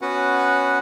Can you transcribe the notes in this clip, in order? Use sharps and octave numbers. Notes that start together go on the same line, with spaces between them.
B3 C#4 F#4 B4 F#5